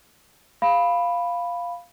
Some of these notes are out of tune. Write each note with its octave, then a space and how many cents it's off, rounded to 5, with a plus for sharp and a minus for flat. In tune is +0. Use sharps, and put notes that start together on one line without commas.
F5 +0 B5 +0